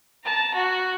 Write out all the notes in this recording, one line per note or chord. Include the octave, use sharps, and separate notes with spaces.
A5 A#5
F#4